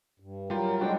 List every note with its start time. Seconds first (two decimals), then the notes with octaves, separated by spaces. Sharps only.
0.20 G2
0.50 F#3 G3 F4 A#4 G5
0.81 F#3 G#3 D4 F#4 G5